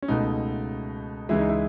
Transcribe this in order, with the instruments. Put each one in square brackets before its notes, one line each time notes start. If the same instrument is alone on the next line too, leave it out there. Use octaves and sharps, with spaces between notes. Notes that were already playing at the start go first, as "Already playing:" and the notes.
[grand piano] C#4
C#2 B2 A3 D#4
C#2 C#3 E3 G#3 E4
D#4
E4